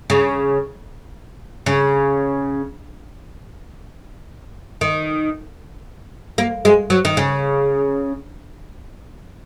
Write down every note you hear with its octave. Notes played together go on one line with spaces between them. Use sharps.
C#3
C#3
D#3
A#3
G#3
F#3
D#3
C#3